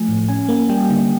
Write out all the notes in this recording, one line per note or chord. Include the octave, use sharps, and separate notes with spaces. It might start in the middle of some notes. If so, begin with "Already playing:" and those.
Already playing: F3 A3 G#5
A2
C#4 G#5
A#3
G3 G5
D3